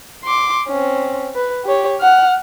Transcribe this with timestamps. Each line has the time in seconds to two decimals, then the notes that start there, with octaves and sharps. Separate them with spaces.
0.24 C6 D6
0.68 C4 C#4
1.35 B4
1.65 G4 C#5
2.01 F#5 F6